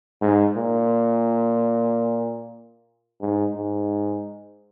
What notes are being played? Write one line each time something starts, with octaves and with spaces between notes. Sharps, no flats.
G#2
A#2
G#2
G#2